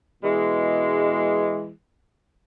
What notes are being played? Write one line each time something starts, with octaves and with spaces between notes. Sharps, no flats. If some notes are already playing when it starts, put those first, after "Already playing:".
B2 E3 G#3